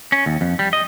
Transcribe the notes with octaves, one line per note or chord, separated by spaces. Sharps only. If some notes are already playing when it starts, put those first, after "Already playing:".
C#4
D#2
F2
G3
D#5